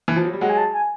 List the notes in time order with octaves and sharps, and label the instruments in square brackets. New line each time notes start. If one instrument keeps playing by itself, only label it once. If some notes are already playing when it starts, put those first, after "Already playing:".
[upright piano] E3
F3
F#3
G3
[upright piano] F#3 G#3 [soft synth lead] F#5
[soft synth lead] G#5
A5
G#5